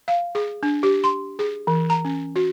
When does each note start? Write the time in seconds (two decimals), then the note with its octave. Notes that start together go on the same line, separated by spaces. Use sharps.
0.08 F5
0.35 G#4
0.63 D4
0.83 G4
1.04 C6
1.39 G#4
1.67 E3
1.90 A#5
2.05 C#4
2.36 F#4